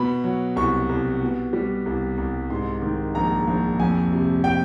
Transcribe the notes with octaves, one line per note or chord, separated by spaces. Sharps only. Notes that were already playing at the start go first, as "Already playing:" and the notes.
Already playing: B2 B5
F#3
C2 C#6
C2
B2
G3
C2
C2
G#2 C6
D#3
A#1 A#5
A#1
F2 G#5
C3
G5